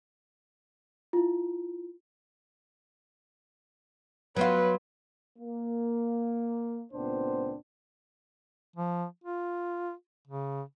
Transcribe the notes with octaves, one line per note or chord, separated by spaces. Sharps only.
E4 F4
F#3 B3 F4 B4
A#3
C#2 A#2 B3 C4 D4 C5
F3
F4
C#3